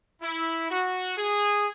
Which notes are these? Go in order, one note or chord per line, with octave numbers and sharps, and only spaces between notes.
E4
F#4
G#4